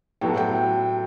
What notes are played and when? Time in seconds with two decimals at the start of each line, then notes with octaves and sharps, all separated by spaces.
0.21 A2 F#3 B3 F#4 A4 G5
0.37 G5